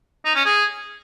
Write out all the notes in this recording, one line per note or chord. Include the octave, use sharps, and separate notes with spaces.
D#4
C#4
G#4